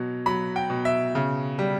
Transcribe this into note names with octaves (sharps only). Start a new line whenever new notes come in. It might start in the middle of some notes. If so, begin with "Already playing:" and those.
Already playing: B2 F#3
F#3 B5
G5
B2
E5
C#3
G3